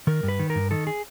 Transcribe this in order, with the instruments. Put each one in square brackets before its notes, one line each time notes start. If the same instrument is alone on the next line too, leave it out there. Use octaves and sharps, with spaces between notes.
[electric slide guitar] D#3 A#4
G2
B4
D#3
A#4
G2
D#3 A4
G#4